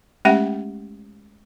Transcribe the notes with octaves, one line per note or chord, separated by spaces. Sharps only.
G#3 A3 C#4 G4 E5 F#5